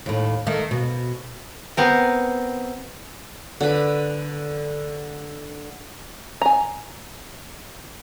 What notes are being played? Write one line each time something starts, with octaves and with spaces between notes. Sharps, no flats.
D#2 A2
D#3 A3
B2
B3 C4 A#4
D3 B4
G#5 A#5